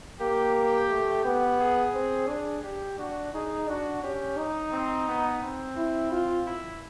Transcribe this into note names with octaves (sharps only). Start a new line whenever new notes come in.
A#3 G4
A3
B3 G4
G#4
C4
D4 G#4
G4
D4 F#4
D#4 G#4
D4 F#4
C#4 G4
D#4
C4
B3
C4
E4
F4
E4